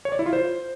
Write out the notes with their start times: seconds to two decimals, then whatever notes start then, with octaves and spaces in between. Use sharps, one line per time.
0.05 C#5
0.12 D5
0.19 E4
0.26 F4
0.33 C5